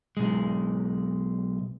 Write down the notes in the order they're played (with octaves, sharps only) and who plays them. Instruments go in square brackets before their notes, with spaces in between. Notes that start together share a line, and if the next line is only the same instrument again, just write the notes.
[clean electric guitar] B1 G#3